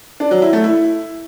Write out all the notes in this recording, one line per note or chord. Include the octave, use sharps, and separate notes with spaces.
D4
F#3
E4
A3
E4